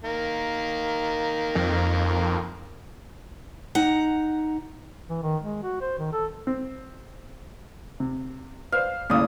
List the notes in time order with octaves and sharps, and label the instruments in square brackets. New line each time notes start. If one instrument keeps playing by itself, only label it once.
[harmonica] D#3 A#3
[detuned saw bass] F2
[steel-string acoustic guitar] D#4 F#5 A#5
[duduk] E3
D#3
G#3
F#4
C5
D#3
A4
[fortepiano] C4
C3
[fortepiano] B4 C5 D5 [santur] F5
[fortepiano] D#2 A2 C#3 [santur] D5 D#6